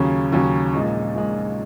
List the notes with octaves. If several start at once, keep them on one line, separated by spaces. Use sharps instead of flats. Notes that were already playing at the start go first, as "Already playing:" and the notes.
Already playing: D#2 C#3 F#3 C#4
D#2 C#3 F#3 C#4
A#1 A#2 G#3 D#4
A#1 A#2 G#3 D#4